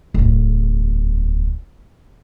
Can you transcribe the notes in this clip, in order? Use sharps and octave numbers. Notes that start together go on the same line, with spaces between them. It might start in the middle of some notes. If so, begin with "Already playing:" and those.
D1 E2